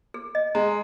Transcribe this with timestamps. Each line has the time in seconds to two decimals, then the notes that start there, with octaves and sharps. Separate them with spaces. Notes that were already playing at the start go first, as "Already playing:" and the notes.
0.14 G#4
0.35 D#5
0.55 G#3 A#5